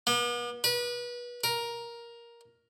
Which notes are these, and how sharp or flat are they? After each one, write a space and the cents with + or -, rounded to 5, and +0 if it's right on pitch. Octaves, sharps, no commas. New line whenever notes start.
B3 -40
B4 -30
A#4 +10